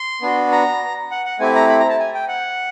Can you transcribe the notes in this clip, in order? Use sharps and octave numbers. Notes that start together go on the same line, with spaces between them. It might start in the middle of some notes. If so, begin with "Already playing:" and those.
Already playing: C6
B3 D4 F#4
A#5
F#5
F#5
A3 C4 E4 G4 G#5
A#5
B5
A#5
A5
G#5
G5
F#5